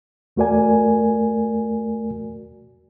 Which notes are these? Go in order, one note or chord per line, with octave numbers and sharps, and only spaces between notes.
E2 A3 F#4 A#4 D5 G#5